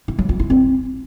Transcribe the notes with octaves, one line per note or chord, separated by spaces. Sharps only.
E4
F#3
F4
E4
C4